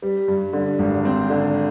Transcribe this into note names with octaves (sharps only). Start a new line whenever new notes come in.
G3
G2
D3
G#1
C4
D3